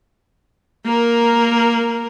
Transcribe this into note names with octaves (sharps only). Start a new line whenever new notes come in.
A#3 A#4